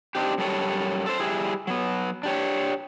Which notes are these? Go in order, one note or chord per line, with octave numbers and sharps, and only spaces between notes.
C4 D4 D#4 G4
F#2 G3 A4 C#5
A4 C5
G3 E4 G#4
F#3 B3
D4 G4 C#5